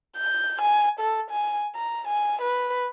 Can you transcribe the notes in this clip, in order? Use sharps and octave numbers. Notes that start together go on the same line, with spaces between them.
G6
G#5
A4
G#5
A#5
G#5
B4